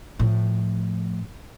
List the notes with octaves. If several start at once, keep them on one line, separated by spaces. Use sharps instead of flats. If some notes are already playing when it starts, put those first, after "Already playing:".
A2 F3